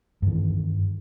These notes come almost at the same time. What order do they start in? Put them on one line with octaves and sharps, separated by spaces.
G2 D#3 E3